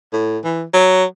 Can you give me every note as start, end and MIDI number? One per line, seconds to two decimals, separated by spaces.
0.13 0.38 45
0.44 0.63 52
0.73 1.04 54